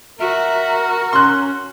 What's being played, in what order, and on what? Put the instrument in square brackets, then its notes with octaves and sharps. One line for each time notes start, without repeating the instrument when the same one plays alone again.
[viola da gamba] F#4 [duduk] A#4 [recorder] E5
[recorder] C#4 [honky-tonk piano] C6 F#6